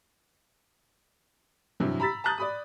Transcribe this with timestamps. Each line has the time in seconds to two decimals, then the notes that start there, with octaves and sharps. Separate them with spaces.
1.80 G2 C3 E3 F#3
2.00 A#5 B5 E6 A6 B6
2.24 A5 A#5 D#6 F#6 G6 A6
2.38 D5 B5 D#6